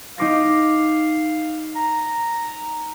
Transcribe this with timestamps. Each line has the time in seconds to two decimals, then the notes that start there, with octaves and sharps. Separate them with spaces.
0.18 D#4 F5 D6 A#6
1.75 A#5